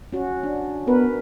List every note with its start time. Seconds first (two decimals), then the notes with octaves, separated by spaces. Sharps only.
0.13 C#4 F#4
0.43 D4
0.87 B3 A#4 B4